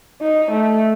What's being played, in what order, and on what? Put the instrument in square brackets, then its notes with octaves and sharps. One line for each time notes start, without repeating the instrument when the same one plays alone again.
[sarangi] D#4
A3